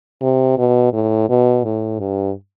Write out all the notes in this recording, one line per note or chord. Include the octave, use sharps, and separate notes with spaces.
C3
B2
A2
B2
A2
G2